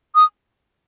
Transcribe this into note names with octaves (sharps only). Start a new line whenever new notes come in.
D#6